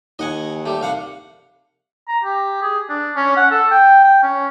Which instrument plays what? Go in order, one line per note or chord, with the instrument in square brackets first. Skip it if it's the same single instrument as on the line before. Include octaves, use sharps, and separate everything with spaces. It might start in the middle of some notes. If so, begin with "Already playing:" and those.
[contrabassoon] D#2 [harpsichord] D#5 F#5 G#5
[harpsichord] G3 A3
C2 F5 F#5
[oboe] A#5
G4
G#4
D4
C#4
F#5
A4
G5
G5
C#4